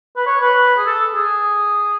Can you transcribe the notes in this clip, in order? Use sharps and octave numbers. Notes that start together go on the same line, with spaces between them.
B4
C#5
B4
G#4
A4
G#4